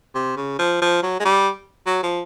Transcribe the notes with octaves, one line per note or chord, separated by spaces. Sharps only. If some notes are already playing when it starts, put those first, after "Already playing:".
C3
C#3
F3
F3
F#3
G#3
G3
F#3
F3